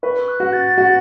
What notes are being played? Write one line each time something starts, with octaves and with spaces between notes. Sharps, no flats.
B4 C#6
F#6
F#4
A6
F#4